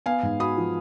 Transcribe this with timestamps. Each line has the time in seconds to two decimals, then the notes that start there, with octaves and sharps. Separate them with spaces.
0.06 B3 F5 G#5
0.23 G#2
0.40 F#4 B5 D#6
0.57 F3